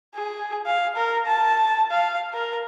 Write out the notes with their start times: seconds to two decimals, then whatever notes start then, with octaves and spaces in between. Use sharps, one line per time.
0.15 G#4
0.66 F5
0.96 A#4
1.26 A5
1.91 F5
2.33 A#4